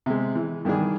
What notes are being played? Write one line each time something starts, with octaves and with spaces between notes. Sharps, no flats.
C3 G#3
E3
G2 D#3 E3 D4 G#4